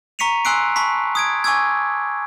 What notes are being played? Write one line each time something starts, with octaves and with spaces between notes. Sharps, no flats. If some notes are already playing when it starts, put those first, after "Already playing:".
A#5 C#6 B6 C#7 D#7 F7
G#5 C6 E6 F#6 C7 D7
A5 B5 C#6 B6
D#6 G#6 D7
G#5 C#6 D6 E6 G#6